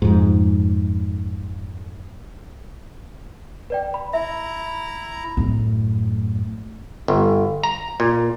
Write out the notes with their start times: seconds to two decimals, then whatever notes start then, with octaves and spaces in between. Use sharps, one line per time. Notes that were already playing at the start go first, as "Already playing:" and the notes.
0.02 F2 G#2
3.70 B4 D5 G5
3.94 B5
4.13 E4 E5 A#5
5.37 F#2 A2
7.08 G1
7.64 A#5
8.00 A#2